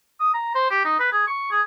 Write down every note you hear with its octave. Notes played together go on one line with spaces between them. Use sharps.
D#6
A#5
C5
G4
D#4
B4
G#4
C#6
G#4